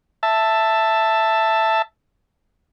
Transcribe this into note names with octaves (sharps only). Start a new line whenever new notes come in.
E5 A5